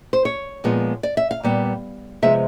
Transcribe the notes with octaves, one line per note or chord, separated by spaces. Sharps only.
C5
C#5
A#2 F3 G#3 B3
D5
E5
F5
A#2 G3 B3
C3 F3 G#3 B3 E5